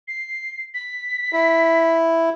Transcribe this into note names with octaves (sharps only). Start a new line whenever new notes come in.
C7
B6
E4